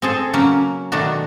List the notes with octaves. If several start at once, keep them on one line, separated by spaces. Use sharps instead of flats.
C4 G#4 A4
C#3 F#3 A#3 C#4
B2 D#3 A3 D4 F#4